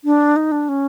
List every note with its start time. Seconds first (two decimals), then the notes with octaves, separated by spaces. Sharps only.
0.04 D4
0.36 D#4
0.52 D4
0.69 C#4